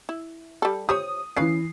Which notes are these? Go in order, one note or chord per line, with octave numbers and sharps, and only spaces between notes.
E4
G3 A4
G4 C5 C#5 D#6
E3 C#4 B4 F5 C7